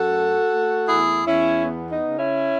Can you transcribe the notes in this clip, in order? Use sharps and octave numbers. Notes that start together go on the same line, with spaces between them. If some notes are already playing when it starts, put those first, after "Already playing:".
Already playing: F#2 F#4 A4
A3
A3
E2 E4 G#4
E2 C#4 E4
B3
D#4
C#3
C#4 E4